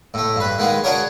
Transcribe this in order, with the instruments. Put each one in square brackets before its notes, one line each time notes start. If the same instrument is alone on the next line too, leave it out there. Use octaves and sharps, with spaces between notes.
[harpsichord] A2 A3
G2 B4
D#3 G#3 B3 F4
D4 F#4 G#4 A#4 C#5